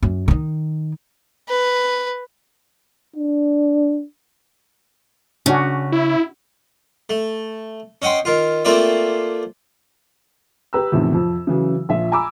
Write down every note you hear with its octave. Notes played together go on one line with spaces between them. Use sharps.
F#2
D#3 D#4
B4
D4
C#3 C#4 D4 F#4
E4
A3
C#4 D#5 F#5 G5 C6
D#3 F4
A3 A#3 C4 F4 D5 E5
G4 B4 A#5 E6
E2 A2 C3 D#3 F3
F2 F3
C#3 E3 F#3
A#1 F3 F4 E5
G#5 A#5 B5 D6 E6